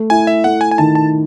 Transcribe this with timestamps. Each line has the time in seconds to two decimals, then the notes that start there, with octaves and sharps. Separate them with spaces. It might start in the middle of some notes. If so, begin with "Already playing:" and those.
Already playing: A3
0.10 E4 G#5
0.27 E5
0.44 A3 F#5
0.61 G#5
0.71 G#5
0.78 D#3 A5
0.95 A5